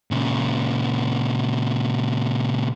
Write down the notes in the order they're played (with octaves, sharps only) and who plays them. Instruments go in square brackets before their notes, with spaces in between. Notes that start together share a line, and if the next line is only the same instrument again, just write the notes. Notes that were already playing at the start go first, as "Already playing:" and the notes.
[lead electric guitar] A#2 C#3